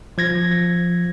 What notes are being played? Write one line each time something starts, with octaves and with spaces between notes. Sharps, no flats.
F3 G#6 A#6